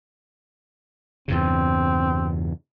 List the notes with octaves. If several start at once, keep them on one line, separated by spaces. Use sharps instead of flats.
E2 G2 C#3 C4